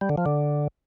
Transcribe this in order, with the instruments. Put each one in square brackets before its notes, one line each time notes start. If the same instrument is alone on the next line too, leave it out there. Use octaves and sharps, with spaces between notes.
[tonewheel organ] G3
D3
F3
D3